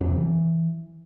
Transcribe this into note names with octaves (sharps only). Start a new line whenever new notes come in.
F2
C3
E3